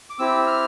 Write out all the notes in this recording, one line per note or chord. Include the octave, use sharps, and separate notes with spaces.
D6
C4 E4 G4 E6
E6
F6